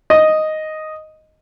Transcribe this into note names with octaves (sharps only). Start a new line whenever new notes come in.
D#5